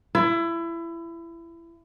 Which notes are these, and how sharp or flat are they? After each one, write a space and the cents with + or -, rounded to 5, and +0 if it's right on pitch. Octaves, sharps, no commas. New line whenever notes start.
E4 +25